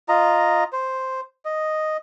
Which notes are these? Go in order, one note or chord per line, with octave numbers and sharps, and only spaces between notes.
F4 D#5 A#5
C5
D#5